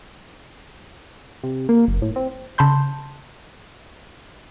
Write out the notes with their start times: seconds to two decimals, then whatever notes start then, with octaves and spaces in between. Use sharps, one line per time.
1.43 C3
1.69 A#3
1.88 F#1
2.02 A2
2.16 C4
2.58 C#3 A5 B5 C6 G6